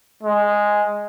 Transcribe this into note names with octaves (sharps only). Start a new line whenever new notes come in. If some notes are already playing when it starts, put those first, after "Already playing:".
G#3